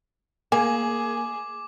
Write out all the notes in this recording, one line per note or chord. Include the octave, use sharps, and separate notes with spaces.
A#3 G#4 G#5 D6